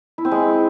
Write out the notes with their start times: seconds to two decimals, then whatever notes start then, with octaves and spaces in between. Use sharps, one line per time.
0.18 E4
0.25 C4
0.32 G#3